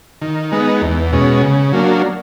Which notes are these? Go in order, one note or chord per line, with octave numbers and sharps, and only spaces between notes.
D#3
G#3 B3 D#4
E2
B2 G#3 C#4
C#3
F#3 A#3 D4